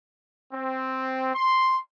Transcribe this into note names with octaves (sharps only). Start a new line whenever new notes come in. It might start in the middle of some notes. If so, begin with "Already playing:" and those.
C4
C6